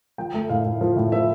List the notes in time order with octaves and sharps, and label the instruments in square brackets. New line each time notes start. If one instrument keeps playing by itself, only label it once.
[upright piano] F3 G5
A3
A2 F5
A2
F3
A2
F3 E5